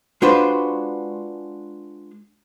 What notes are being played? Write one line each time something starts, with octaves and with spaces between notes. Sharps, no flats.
G#3 D4 F4 F#4 B4 C5